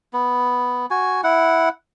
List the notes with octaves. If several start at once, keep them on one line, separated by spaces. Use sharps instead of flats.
B3
F#4 G#5
E4 F#5